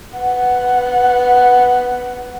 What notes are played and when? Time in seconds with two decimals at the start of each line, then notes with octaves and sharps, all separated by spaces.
0.16 B3 F#5